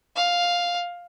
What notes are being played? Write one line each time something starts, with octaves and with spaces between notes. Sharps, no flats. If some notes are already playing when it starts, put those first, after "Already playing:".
F5